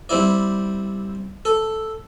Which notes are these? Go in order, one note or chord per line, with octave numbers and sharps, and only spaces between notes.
G3 C4 E4 D5
A4